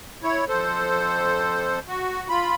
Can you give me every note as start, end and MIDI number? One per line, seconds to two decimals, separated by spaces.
0.23 0.45 64
0.23 0.45 73
0.48 1.79 41
0.48 1.79 69
0.48 1.79 72
1.88 2.28 66
2.29 2.55 65
2.29 2.55 83